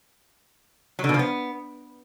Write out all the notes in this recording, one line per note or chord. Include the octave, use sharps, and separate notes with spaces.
F#3
D3
B2
F3
B3